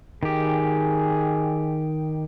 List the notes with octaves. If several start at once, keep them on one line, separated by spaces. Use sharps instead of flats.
D#3 G4 G#4